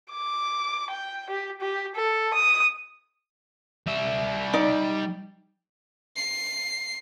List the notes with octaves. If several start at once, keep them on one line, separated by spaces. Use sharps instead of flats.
D6
G5
G4
G4
A4
D#6
G3 E5
D#4 D5
C7